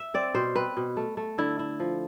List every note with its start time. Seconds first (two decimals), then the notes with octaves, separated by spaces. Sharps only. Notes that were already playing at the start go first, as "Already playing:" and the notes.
Already playing: E5
0.14 C4 D5
0.35 B2 C5
0.55 C4 B4
0.77 B2
0.97 A3
1.17 A3
1.38 D3 E4
1.59 E4
1.80 F3